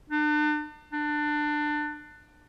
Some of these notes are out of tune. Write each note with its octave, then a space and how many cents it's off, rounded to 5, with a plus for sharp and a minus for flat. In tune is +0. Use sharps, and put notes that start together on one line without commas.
D4 +40
D4 +25